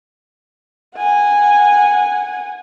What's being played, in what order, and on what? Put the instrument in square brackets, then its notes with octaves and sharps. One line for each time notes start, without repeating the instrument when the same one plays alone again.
[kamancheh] F#5 G#5